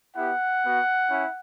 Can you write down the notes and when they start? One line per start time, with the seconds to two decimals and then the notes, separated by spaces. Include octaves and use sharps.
0.16 B3 E4 G4 F#5
0.63 B3 F#4
1.10 C#4 E4